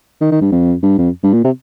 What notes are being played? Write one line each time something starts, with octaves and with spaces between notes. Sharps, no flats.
D#3
D#3
G2
F2
G2
F2
G2
A#2
C3